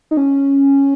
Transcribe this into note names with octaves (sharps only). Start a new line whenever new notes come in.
D#4
C#4